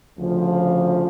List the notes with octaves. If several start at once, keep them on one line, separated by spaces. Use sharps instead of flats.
D2 C#3 F3